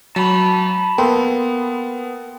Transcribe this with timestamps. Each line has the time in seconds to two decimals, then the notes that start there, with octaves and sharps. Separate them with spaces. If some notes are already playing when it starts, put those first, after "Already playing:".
0.16 F#3 A5 B5
0.98 A#3 B3 A4 G5 C6